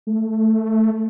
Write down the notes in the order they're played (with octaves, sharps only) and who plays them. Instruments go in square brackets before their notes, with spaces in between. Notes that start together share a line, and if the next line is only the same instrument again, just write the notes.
[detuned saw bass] A3